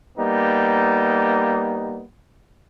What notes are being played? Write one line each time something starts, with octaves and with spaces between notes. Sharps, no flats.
G3 A#3 B3 D#4